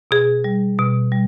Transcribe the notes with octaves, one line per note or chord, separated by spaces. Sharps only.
B2 G#4
G3
B2
G3